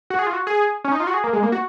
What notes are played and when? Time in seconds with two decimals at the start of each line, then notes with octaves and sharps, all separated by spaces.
0.10 F#4
0.19 G#4
0.27 F4
0.33 F#4
0.47 G#4
0.84 C#4
0.92 D#4
1.00 F4
1.07 F#4
1.14 G#4
1.24 A#3
1.33 G#3
1.43 A#3
1.52 F#4